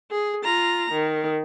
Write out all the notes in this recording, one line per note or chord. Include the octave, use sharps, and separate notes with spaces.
G#4
F4 A#5
D#3